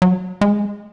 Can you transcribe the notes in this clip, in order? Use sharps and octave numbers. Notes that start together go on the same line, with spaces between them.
F#3
G#3